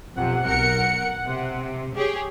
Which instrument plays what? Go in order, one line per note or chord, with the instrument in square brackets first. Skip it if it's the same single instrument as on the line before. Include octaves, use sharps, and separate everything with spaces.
[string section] B1 F2 C3 [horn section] F#5
[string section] B1 A#4 C#7
C3
G4 G#4 C#5